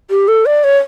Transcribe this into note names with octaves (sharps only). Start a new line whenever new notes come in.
G4
A4
D5
C#5